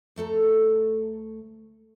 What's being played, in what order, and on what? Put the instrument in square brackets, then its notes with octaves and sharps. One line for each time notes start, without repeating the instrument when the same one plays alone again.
[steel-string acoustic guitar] D2 A3 A4 A#5